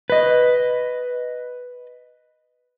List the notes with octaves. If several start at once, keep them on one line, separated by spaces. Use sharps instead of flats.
B4 D#5